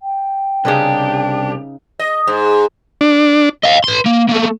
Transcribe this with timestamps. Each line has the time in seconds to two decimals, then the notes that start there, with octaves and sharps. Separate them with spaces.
0.02 G5
0.65 C2 C#3 D4 D#4 G4 B4
1.99 D#5
2.27 G#2
3.01 D4
3.63 D#5 F5
3.84 B4 C6
4.06 A#3
4.29 A3 A#3